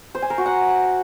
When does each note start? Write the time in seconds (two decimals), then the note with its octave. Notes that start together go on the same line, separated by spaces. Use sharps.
0.15 C5
0.22 G#5
0.30 A#4
0.38 F#4
0.46 F#5